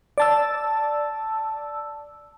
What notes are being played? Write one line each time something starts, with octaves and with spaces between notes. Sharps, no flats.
D5 A5 E6